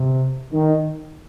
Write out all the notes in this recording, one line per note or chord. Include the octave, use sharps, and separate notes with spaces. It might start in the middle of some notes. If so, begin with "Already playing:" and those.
Already playing: C3
D#3